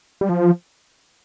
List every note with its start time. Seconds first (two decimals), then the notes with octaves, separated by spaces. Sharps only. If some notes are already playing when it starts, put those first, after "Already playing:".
0.21 G3
0.29 F3